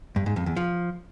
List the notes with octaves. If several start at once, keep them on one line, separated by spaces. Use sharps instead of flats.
G2
G#2
F2
E2
F3